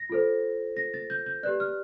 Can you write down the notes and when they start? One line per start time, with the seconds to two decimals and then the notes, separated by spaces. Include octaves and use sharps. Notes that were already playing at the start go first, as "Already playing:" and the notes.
Already playing: A#6
0.10 F4 A4 C5
0.77 A#6
0.94 A6
1.10 G6
1.26 G6
1.43 G4 B4 D5 F#6
1.60 F6